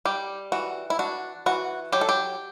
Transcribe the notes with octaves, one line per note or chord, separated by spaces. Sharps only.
G3 G4
E3 F#4
E4
D4 F#4
E3 F#4
F#3 G4
A4
G4